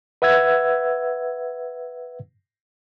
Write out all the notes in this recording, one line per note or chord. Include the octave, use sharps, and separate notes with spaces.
B4 E5 F#5 E6 G#6